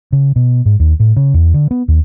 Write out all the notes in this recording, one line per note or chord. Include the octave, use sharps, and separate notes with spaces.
C#3
B2
G#2
D#2
A2
C#3
E2
D3
B3
D#2